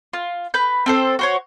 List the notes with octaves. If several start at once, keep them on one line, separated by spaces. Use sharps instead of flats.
F4
B4 G6
C4 A4 C5
F#4 C5 C#5